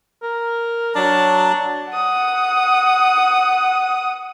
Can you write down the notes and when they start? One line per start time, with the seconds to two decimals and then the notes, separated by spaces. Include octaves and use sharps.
0.23 A#4
0.95 F#3 D4 A5
1.91 F#5 D#6